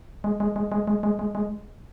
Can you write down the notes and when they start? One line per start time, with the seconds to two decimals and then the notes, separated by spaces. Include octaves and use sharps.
0.24 G#3
0.40 G#3
0.56 G#3
0.72 G#3
0.88 G#3
1.03 G#3
1.19 G#3
1.35 G#3